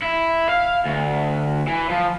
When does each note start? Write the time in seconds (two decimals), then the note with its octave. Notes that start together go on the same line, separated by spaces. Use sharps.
0.02 E4
0.49 F5
0.86 D2
1.68 E3
1.90 F3